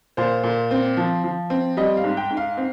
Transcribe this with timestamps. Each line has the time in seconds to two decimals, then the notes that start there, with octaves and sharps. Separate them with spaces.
0.17 A#2 C5
0.43 A#2
0.71 C4
0.97 F3
1.24 F3
1.50 C4
1.77 G3 D#5
1.97 F5
2.04 G#2
2.17 G5
2.30 G#2
2.37 F5
2.57 C4